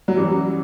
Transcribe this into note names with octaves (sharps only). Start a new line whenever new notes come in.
F#3
F#2 E3 G3